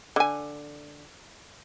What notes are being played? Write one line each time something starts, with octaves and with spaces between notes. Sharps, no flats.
D3 G#5